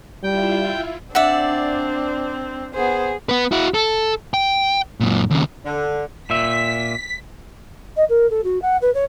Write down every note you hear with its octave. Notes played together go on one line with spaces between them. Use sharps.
G3 E4 F4 E5 G5
C4 D4 D5 E5 F#5
B3 G#4 C5
B3 B4
E4 F#4
A4
G5
F#2 A#2
D#2 C#3
D3
A#2 E5 B6
D#5
A#4
A4
F#4
F#5
B4
C#5